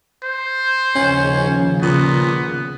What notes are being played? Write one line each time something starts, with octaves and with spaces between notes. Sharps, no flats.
C5
D#2 C#3 F3 C#4
A#2 B3